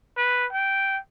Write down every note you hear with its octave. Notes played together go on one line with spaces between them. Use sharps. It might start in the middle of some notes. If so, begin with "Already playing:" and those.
B4
G5